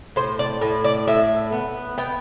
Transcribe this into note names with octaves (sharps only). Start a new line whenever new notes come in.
A2 C5
D5
A2
D5
A2 E5
B3
B3 G5